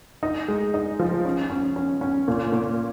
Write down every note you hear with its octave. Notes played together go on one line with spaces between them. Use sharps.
D#4
G#3
D#4
F3
C#4
C#4
C#4
C#4
A#2
A#2